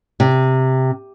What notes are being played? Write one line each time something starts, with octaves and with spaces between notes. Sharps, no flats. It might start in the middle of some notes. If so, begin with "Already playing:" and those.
C3